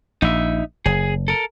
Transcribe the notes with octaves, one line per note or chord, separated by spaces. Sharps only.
A#1 D#4 E5
F#1 G#4
A4 A#4